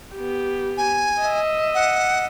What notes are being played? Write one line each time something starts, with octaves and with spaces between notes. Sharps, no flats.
B3 G4
G#5
D#5 E5
F#5